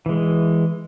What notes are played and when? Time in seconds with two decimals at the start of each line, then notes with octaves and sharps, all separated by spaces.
0.06 E3 G#3